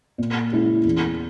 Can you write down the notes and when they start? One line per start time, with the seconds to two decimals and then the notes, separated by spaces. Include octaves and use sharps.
0.18 A#2
0.52 G#3 C#4 E4
0.84 E2